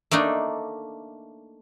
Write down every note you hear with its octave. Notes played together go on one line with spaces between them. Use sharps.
A3 A#3 D4 D#4